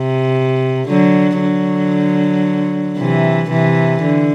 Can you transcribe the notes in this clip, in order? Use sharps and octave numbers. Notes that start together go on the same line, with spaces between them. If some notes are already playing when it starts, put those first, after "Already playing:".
Already playing: C3
D3 F#3
D3 F#3
C3 E3
C3 E3
D3